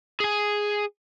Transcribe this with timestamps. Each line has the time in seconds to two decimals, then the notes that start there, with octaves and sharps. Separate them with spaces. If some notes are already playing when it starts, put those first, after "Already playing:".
0.20 G#4 G#5